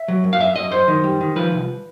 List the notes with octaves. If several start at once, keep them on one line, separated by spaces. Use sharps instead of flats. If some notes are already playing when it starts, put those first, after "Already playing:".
Already playing: E5
F#3
F#2
F5
F#2 E5
F#2 D#5
F#2 C5
D#3
G3
D#3
F3 B4
C2